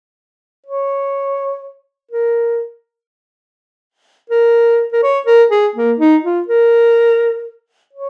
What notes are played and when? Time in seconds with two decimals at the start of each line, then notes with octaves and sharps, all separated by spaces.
0.66 C#5
2.11 A#4
4.30 A#4
4.93 A#4
5.03 C#5
5.26 A#4
5.51 G#4
5.75 A#3
6.00 D#4
6.24 F4
6.48 A#4
7.93 C#5